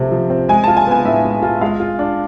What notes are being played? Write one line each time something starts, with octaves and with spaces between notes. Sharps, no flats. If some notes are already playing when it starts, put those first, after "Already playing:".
Already playing: C3 F3 A3 C4
F3
C4
G#3 G#5
F4 A5
G#5
B3 G#5
A2 E5
G#3
F4
G#3 F5
F4
D4